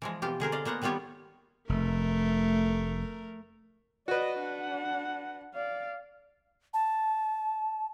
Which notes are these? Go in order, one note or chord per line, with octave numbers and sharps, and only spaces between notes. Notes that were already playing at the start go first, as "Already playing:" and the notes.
E3 F3 G#3
B2 E3 F4 G4
D3 G#4 A#4 C5
D5 D#5 F5
A#3 B3 C5 F#5 A#5
D#3 G3 B3 F4 G4 C#5
F1 A3 A#4
F#4 B4 D5 D#5
D4 F#5
D5 F5
A5